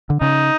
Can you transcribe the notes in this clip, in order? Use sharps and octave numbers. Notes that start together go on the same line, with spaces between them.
D3
C#3 D#4